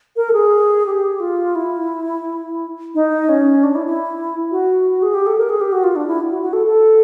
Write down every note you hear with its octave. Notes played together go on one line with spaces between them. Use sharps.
A#4
A4
G#4
G4
F4
E4
D#4
C#4
D4
E4
E4
F#4
G#4
G4
A4
A#4
G#4
G4
F#4
F4
D4
E4
F#4
F#4
A4
A4